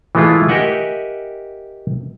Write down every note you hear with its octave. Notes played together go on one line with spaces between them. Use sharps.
E3 G#3 A3 E4 F4
G4 A#4 D#5 E5 F#5 G#5